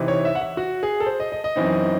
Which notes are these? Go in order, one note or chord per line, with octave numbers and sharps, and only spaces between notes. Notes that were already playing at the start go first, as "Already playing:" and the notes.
Already playing: C3 E3 C4 D#4
C#5
E5
F#5
E5
F#4
G#4
A4
C5
D#5
D#5
D#5
F#2 E3 C4 D#4